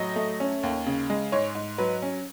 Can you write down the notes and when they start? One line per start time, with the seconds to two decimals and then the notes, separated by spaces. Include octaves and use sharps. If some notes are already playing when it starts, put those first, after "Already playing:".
Already playing: A2 F#3 D#5
0.16 A3
0.40 C#4
0.63 D#2
0.86 C#3
1.10 G#3
1.32 G#2 C#5
1.55 G#2
1.78 F#3 B4
2.02 C#4